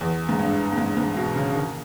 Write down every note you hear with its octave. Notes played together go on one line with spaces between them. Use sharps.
E2
G#2
G2
G2
G#2
G#2
B2
C#3
D#3